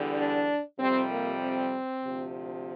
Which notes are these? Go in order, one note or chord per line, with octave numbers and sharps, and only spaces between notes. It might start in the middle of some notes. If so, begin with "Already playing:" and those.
Already playing: E2 D3 G3
D4
F2 C3 G3 C4
A#3
C4
D2 C3 F3